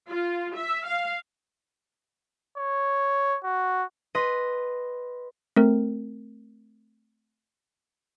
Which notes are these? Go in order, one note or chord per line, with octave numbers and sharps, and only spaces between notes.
F4
E5
F5
C#5
F#4
B4 D#5 C6
A3 C4 A#4